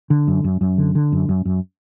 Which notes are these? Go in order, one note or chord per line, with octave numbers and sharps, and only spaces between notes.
D3
F#2
F#2
F#2
D3
D3
F#2
F#2
F#2